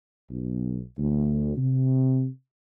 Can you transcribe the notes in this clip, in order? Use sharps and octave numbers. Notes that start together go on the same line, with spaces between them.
B1
D2
C3